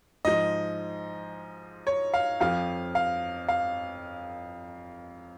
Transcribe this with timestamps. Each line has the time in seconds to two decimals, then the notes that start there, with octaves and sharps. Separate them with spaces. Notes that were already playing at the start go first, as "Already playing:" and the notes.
0.25 G#2 F3 D#5
1.87 C#5
2.14 F5
2.40 F2 F3 F5
2.95 F5
3.48 F5